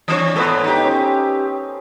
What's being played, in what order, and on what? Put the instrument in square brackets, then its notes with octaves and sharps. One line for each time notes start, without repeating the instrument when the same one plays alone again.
[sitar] E3 C4 D4 [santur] C#5 D#5
[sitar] G#2 B4 [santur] B3 A4
[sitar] D#4 G4
[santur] C#4 C5 D#5